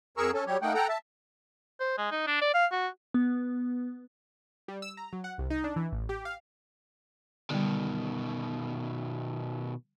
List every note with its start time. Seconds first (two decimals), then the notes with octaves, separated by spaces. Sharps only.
0.17 F2 G#4 A#4 C#6 E6
0.34 C#4 A4
0.47 F#3 G3 G4 C#5
0.62 A3 A#3 D#4 F#5 G5
0.74 A4 F#5 G5 A#5
0.89 E5 A5
1.80 C5
1.98 G#3
2.11 D#4
2.27 D4
2.41 D5
2.54 F5
2.72 F#4
3.14 B3
4.68 G3
4.82 E6
4.97 A#5
5.13 F#3
5.24 F#5
5.38 C2
5.50 D#4
5.64 D4
5.76 E3
5.92 A1
6.09 G4
6.25 F5
7.50 B2 D3 D#3 G3